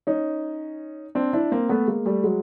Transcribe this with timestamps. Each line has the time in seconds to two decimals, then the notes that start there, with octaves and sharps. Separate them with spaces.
0.07 C#4 D#4
1.15 C4 D4
1.33 D4 E4
1.52 A#3 C4
1.69 A3 B3
1.87 G#3 A#3
2.06 G3 A3
2.24 F#3 G#3